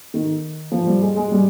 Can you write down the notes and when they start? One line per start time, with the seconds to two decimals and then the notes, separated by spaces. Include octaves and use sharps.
0.14 D#3
0.72 F3
0.87 G3
1.02 G#3
1.16 G#3
1.31 G3